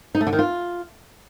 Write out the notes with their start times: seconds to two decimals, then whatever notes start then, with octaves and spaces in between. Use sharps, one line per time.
0.15 D#4
0.21 A3
0.27 D3
0.33 D#3
0.39 F4